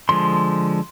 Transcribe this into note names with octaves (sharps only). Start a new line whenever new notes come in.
D3 F3 G#3 C6